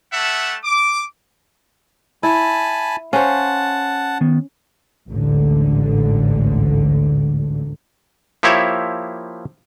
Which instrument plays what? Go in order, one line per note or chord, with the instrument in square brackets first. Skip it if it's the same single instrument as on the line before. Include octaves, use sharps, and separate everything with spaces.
[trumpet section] G3 A3 E5 F#5 A5
D6
[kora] E4 [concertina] G#5 A5 B5
[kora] C#4 C5 [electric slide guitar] F5 [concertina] F#5 A5
[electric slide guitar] D#3 B3
[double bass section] A1 D2 G#2 D3
[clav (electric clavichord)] F3 A#3 E4 G4 C#5 E5